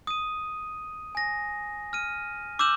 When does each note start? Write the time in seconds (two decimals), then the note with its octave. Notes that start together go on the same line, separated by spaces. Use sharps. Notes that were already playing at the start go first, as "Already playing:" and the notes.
0.07 D#6 D#7
1.15 G#5 A#6
1.93 F6 D#7
2.59 D6 E6 F6 G6 E7 F#7